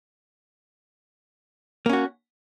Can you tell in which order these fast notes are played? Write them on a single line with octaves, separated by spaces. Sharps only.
A#3 C#4 F#4